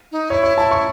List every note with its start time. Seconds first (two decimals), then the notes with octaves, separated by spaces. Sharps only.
0.12 D#4
0.30 E4 C#5
0.43 C#5
0.58 E4 A5
0.71 C#6